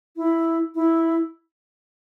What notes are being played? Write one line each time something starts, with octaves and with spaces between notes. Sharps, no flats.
E4
E4